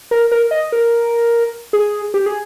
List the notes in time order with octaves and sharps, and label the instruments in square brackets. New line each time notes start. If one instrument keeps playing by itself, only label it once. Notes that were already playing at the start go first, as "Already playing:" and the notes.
[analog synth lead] A#4
A#4
D#5
A#4
G#4
G4
G#4